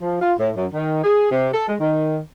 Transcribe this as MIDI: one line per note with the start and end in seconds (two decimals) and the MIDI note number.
0.02 0.21 53
0.21 0.34 65
0.39 0.51 45
0.56 0.67 42
0.73 1.02 51
1.04 1.29 68
1.31 1.49 48
1.54 1.66 69
1.68 1.76 56
1.81 2.19 51